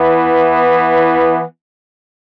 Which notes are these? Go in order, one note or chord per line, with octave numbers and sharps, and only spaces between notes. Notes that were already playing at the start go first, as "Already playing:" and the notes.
Already playing: E3 B3 E4